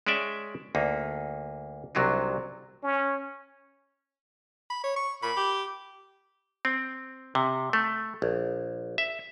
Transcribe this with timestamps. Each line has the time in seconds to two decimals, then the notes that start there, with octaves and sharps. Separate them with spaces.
0.07 G#3 C#4 D5 E5 G5
0.75 D2 A#3 D#4
1.95 C2 C3 F#3 D4 D#4
2.83 C#4
4.70 B5
4.84 C#5
4.96 C#6
5.23 A#2 B5
5.36 G4
6.65 C4
7.35 C3
7.73 A3
8.22 A#1
8.98 E5